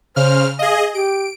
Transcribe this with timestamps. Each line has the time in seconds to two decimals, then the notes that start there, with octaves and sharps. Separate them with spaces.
0.16 C#3 C5 F6
0.59 G#4 D#5 F5
0.94 G4 D7